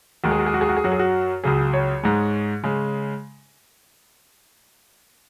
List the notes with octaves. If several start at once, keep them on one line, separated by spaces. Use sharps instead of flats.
D#2 D#3 G#3 F#4
G#4
F#4
G#4
F#4
G#4
F#4
G#4
F#2 F#3 F#4
G#4
F#4
C#2 C#3 F#3 G#4
C#5
G#2 G#3
C#3 G#3